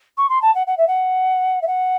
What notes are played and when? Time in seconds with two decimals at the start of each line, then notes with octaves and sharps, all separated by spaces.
0.17 C#6
0.29 C6
0.42 A5
0.55 F#5
0.67 F#5
0.77 E5
0.87 F#5
1.62 E5
1.67 F#5